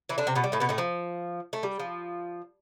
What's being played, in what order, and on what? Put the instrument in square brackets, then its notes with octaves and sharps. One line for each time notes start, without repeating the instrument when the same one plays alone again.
[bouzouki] E3 E4
D3 D4
C3 C4
B2 B3
G3
A2 A3
B2 B3
A2 A3
F3
A3
G3
F3